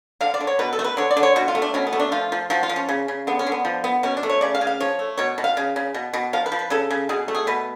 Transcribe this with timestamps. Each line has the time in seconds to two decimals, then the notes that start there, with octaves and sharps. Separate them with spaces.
0.21 D3 F5
0.34 D5
0.40 D3
0.47 C#5
0.59 B2 B4
0.73 A4
0.79 A3
0.84 B4
0.97 D3 C#5
1.11 D5
1.17 D3
1.23 C#5
1.36 B2 F#4
1.48 F4
1.55 A3
1.62 D4
1.74 B2 C#4
1.87 B3
1.93 A3
1.99 D4
2.12 F3 F4
2.32 F3
2.50 F3 F#4
2.63 F4
2.69 F3
2.76 C#4
2.89 C#3
3.08 C#3
3.27 D3 B3
3.39 C#4
3.47 D3
3.52 B3
3.65 F3
3.84 B3
4.03 B2 C#4
4.17 D4
4.23 A3
4.29 C#5
4.41 C#3 D5
4.55 F5
4.61 C#3
4.67 F5
4.80 F3 C#5
4.99 A3
5.17 B2 C#5
5.38 B2
5.44 F5
5.57 C#3
5.76 C#3
5.94 B2
6.14 B2
6.33 F3 F5
6.46 B4
6.52 F3
6.59 B4
6.70 C#3 A4
6.90 C#3
7.09 B2 G#4
7.28 A3
7.35 G#4
7.47 B2 B4